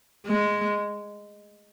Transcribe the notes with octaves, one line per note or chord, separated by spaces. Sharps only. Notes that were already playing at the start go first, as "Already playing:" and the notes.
G#3